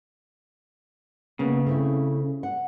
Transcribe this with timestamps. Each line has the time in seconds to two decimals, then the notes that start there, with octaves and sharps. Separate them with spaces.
1.39 C#3 A#3 B3
1.67 A3 C4 E4
2.43 F#5